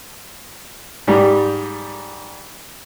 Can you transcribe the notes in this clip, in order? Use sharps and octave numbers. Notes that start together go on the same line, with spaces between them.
G#2 G3